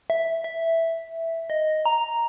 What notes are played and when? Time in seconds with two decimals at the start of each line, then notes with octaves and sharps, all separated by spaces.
0.10 E5
0.44 E5
1.50 D#5
1.86 A#5